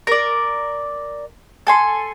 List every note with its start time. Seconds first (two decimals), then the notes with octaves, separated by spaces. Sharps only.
0.07 A#4 D5
1.67 A4 G#5 C6